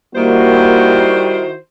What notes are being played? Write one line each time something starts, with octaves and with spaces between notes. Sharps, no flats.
D#3 G3 A#3 E4 F#4 C5